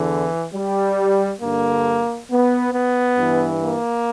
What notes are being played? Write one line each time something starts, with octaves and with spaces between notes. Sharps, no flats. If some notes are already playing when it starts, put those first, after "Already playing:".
Already playing: E2 D3 E3
G3
G2 D3 A#3
B3
B3
G2 E3
A#3